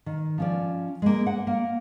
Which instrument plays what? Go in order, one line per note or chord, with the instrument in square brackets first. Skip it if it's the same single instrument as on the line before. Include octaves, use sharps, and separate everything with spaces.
[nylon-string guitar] D#3
F3 C#4 D5
G#3 A#3
F#5
A#3